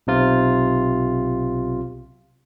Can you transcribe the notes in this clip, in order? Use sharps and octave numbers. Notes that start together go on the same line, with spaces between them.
B1 C3 F4